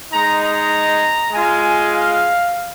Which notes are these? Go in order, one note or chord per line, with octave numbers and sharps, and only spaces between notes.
G#3 D#4 A#5
A#5
G#3 F4 G#5
F5